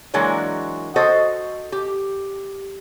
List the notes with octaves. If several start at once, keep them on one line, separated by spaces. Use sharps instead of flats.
E3 F#3 G#3 A#3 D4 F#4
F#4 A4 C5 D#5
G4